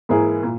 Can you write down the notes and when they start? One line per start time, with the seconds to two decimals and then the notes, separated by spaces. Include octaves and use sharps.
0.09 G#2 E3 A#3 E4 G#4
0.43 A#2